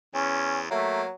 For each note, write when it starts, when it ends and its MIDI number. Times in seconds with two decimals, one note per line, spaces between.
0.14 0.69 40
0.14 0.63 61
0.71 1.13 54
0.71 1.03 57
0.71 1.06 58